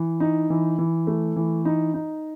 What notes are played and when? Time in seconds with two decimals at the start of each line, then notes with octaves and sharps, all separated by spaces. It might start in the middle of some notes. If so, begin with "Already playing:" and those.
Already playing: E3
0.20 D#4
0.50 E3
0.79 E3
1.07 A3
1.36 E3
1.65 D#4
1.94 D#4